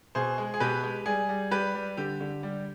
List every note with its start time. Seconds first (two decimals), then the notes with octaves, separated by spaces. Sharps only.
0.15 B2 G#4 C5
0.38 G#3
0.54 G#4
0.60 B2 G4 B4
0.83 G#3
1.06 G3 G#4
1.29 G3
1.51 G3 G4 B4
1.75 G3
1.97 D3 G4
2.20 D3
2.43 G3